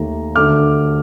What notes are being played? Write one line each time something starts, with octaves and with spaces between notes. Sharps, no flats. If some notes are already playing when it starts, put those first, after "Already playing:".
Already playing: D#2 D#3 A3 A#5
D2 D3 A3 D6 F6